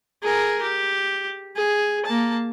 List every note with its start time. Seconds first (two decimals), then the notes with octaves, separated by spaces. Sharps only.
0.23 G#4 A#4
0.62 G4
1.56 G#4
2.06 A#3 A5